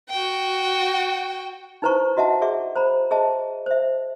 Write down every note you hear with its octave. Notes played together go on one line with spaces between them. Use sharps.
F#4 G5
D#4 E4 B4 C5 A#5 C#6
F#4 D#5 E5 F#5 A5
F#4 G#4 D5 E5 D6
C5 A#5 B5
G#4 C5 D#5 E5 A5
C5 E5